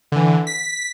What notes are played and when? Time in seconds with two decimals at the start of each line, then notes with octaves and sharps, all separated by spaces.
0.12 D3 E3
0.47 B6